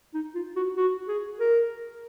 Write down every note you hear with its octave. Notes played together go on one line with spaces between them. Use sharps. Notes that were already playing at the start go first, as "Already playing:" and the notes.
D#4
F4
F#4
F#4
G#4
A#4